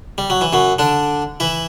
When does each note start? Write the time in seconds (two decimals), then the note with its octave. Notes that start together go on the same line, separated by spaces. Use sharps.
0.18 G3
0.30 F#3
0.41 E3
0.53 F#2 F#3
0.79 D3 D4
1.40 E3 E4